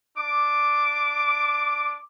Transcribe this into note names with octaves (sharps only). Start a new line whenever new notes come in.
D4 D6